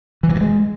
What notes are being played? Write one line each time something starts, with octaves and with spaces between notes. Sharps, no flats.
E3
F#3
G2
G#3